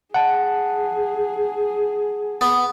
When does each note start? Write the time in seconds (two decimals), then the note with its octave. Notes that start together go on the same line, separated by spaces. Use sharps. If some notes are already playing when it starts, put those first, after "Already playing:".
0.14 G#4 F#5 A5
2.41 B3